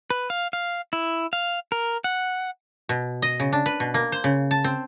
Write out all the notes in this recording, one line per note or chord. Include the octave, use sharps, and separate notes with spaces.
B4
F5
F5
E4
F5
A#4
F#5
B2
D#5
C#3
D4
B4
B2
A#3
C5
C#3
A5
C4